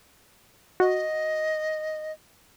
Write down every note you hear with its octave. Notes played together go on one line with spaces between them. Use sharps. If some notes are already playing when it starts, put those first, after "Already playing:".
F#4 D#5